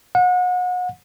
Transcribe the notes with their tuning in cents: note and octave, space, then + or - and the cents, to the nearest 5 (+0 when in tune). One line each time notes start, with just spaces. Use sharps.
F#5 -35